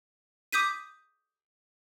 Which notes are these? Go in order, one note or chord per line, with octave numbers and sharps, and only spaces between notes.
D6 D#6 G6 B6 D#7